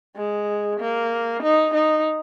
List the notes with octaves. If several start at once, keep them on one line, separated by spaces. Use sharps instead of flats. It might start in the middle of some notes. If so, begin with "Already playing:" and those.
G#3
A#3
D#4
D#4